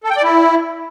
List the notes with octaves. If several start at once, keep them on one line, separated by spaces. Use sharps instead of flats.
A4
G5
D5
E4